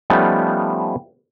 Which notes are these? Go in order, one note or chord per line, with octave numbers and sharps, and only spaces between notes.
F3 G3 A3 B3 C#4 D#4